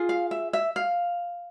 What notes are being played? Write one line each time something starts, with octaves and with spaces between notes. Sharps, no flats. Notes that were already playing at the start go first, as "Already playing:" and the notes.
Already playing: F4 G#4
F5
E5
E5
F5